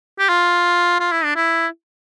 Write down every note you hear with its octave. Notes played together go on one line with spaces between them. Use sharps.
G4
F4
F4
E4
D4
E4